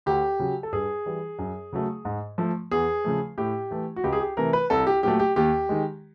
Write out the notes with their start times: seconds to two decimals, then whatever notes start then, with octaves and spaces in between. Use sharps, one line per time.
0.06 D2 G4
0.40 C#3 F#3
0.63 A4
0.72 G2 G#4
1.06 E3 G3
1.39 F#2
1.73 C#3 F#3 A3
2.05 G#2
2.38 F3 A3
2.71 E2 G#4
3.05 C#3 F3 A3
3.38 A2 G4
3.71 E3 A3
3.96 F#4
4.04 C#2 G4
4.13 G#4
4.20 G4
4.37 C3 E3 A3 A#4
4.53 B4
4.70 C2 A4
4.87 G4
5.03 A#2 F#3 A3 G4
5.19 G4
5.36 D#2 G4
5.69 D#3 G#3